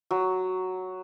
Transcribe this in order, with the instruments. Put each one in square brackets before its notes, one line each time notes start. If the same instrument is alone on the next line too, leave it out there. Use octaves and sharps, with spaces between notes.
[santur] F#3